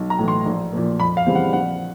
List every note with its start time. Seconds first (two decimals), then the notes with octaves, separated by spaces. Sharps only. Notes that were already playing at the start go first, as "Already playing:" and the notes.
Already playing: B1
0.10 A#5
0.19 A2 E3
0.28 C6
0.46 A#1
0.72 A#2 F3 A#3
1.00 F2 B5
1.17 F5
1.26 C#3 E3 G3 C4
1.35 F#5
1.53 A#1 F#5